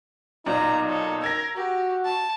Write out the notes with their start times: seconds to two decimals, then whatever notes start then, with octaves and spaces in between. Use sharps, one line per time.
0.46 B1 A#2 D#4 D5 A#5
0.86 A4 C#5
1.21 A#4 E6 G#6 A#6
1.56 F#4 G4
2.04 A5